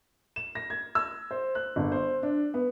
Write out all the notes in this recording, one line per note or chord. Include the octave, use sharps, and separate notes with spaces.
E7
A#6
G#6
E6
C5
F#6
G1
C5
D4
B3